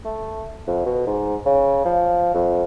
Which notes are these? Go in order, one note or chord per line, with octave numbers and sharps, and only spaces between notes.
A3
F2
B2
G#2
C#3
F3
F2